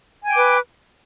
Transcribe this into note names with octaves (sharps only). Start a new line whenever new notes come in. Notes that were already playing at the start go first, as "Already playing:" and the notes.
B4 G5 G#5 D6